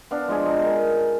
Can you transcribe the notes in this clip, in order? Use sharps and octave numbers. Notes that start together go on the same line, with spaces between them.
B3 D4 F5
F3 G#3 G#4
D#4
A#4